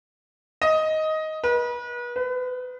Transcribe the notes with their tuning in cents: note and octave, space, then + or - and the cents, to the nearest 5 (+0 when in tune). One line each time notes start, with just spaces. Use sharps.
D#5 +10
B4 -35
B4 +30